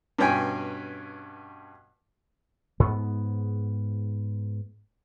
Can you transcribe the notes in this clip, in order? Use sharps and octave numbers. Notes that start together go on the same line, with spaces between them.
G2 B2 C#4 G5 G#5
G#2 B3